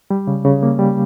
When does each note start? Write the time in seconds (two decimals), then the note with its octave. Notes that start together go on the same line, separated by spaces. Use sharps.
0.11 G3
0.27 C#3
0.45 C#3
0.63 A#3
0.79 G3